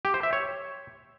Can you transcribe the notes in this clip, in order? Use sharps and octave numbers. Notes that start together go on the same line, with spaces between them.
G4
C5
E5
C#5